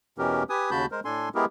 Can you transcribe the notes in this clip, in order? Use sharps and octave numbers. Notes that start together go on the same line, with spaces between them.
E2 B2 E3 C#4 G4 A#4
G4 B4 G#5 D#6
D#2 C#3 F#4 A5 B5 G6
G#3 A#4 C5
A2 D4 A4 G#5 C6
G#3 B3 E4 G4 G#4 A#4